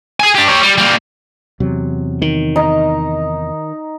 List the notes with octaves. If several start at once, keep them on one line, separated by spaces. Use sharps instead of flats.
G#4 G#5
D4 G4
G4 C#5
G3
G3 A#3
E2 C3 F#3
D#3
D#4